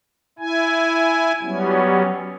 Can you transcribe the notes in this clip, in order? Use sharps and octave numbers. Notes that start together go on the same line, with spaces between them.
E4 G#5
F#3 G3 B3 C#4